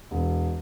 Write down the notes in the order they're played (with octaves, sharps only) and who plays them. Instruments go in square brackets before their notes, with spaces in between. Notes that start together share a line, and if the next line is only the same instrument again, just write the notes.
[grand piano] E1